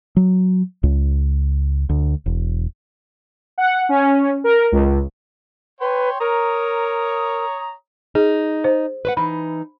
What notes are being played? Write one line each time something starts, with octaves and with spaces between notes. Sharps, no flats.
F#3
C#2
D2
E1
F#5
C#4
A#4
C#2
B4 C#5 G5 C6
A#4 C#5 A#5 D#6
D#4 G#4
C5
B4 C5 F#5
E3 D#4 B5